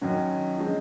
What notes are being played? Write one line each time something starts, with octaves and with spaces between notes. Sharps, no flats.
F#2 D#3 F#3 C#4
F3 G#3 C#4